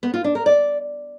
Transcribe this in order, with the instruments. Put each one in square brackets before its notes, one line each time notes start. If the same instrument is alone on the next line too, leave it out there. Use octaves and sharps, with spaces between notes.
[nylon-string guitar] B3
F4
D4
A#4
D5